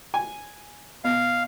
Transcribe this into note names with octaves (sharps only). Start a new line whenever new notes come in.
G#5
B2 F5